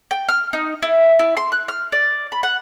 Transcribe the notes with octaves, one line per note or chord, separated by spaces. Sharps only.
G5
F6
D#4
E4
E4
C6
F#6
F6
D5
B5
F#5